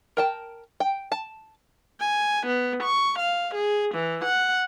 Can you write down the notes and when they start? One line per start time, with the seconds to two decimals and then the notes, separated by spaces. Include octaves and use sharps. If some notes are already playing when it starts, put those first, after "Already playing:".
0.17 A#4 G5 A5
0.80 G5
1.12 A5
1.99 G#5
2.46 B3
2.82 C#6
3.18 F5
3.55 G#4
3.94 E3
4.25 F#5